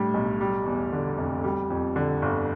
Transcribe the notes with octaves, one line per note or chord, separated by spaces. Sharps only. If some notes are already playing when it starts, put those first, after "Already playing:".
Already playing: A2 G3 D4
B1
G3
E2
D3
F1
G3
F2
D3
G1